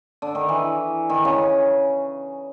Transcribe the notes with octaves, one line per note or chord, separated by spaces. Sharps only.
D3
D#3
E3
D#3
C#3